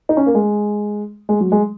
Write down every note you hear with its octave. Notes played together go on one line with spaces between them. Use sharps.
D#4
C#4
A#3
G#3
G#3
F#3
G#3